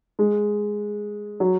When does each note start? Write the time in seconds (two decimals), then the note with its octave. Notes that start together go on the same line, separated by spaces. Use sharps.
0.19 G#3
1.40 F#3